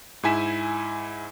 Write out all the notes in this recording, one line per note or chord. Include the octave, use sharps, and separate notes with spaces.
G#2 E4 G#5 B6 E7